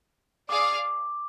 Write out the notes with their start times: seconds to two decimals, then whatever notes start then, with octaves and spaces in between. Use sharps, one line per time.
0.49 G#4 D5 F5 D6